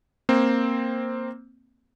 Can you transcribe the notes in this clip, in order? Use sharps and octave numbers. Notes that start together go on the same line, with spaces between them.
A#3 C4